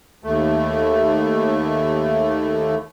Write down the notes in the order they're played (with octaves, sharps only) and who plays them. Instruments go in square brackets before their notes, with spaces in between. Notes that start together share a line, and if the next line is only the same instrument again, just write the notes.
[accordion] D#2 A3